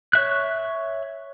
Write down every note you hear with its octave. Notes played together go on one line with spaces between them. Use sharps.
C#5 E5 F#6